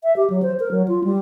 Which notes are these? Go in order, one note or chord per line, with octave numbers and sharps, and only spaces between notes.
E5
G4
F#3
C5
A#4
F#3
F4
G3